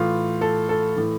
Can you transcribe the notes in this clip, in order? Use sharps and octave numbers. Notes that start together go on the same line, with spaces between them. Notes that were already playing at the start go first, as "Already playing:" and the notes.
Already playing: A2 E3 F4
A4
A4
A2 E3